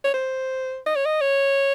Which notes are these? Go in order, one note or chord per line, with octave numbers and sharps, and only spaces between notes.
C#5
C5
D#5
C#5
D#5
C#5